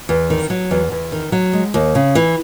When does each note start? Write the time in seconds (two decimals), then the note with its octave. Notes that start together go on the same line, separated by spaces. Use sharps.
0.09 E2
0.30 D#3
0.50 F#3
0.71 E2
0.92 E2
1.12 D#3
1.32 F#3
1.53 G#3
1.74 D#2
1.95 C#3
2.15 E3